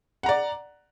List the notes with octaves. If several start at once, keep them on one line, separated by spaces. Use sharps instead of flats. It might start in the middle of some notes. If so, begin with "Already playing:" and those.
D5 F#5 A#5